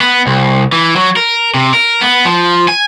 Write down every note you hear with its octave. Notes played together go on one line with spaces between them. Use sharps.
B3
C2
E3
F#3
A#4
C3
A#4
B3
F3
G#5